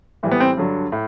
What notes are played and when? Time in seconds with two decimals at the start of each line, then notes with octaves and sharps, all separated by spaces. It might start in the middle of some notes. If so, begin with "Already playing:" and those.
0.23 A2 E3 G3
0.32 B3
0.40 C4
0.57 G2 D3 F#3
0.92 A2